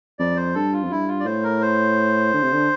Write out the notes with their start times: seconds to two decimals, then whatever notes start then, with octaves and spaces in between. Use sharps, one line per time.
0.19 F2 D5
0.37 C5
0.55 G2 A4
0.73 F4
0.83 F2
0.90 G2 E4
1.08 F4
1.20 D5
1.25 A2 C5
1.44 A#4
1.61 C5
2.33 D3
2.43 C3
2.53 D3